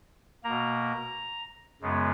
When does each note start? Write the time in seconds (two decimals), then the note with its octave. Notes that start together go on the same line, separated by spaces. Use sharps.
0.44 B2 A#3 A#5
1.82 F#2 C#3 G#3 B3